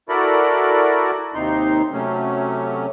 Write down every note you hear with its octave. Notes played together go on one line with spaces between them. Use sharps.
E4 F#4 A4 A#4 D5 B5
D#2 C3 D#4 C6
C3 F#3 A3 C#4